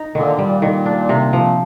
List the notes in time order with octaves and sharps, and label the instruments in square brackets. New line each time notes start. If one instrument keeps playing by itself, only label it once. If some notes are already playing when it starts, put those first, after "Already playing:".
Already playing: [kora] D#4
[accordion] A#2 D3 [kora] D#3
[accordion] A#2 [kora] G3
[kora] D#3
D4
C3
F3